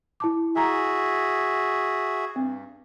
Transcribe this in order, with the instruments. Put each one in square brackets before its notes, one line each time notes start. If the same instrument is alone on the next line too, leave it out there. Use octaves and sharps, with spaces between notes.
[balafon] E4 A5 D6
[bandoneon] F#4 G#4 E5 [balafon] G#5 A#5
[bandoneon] G2 [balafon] C4